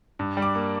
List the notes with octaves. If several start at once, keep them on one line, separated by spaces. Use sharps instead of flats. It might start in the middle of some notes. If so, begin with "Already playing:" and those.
G2
G3
D6
A#3